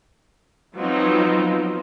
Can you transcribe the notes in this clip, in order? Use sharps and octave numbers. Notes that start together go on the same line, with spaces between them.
F3 F#3 B3 C4 D#4 F4